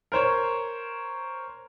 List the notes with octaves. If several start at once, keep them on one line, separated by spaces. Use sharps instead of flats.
A#4 C5 C#5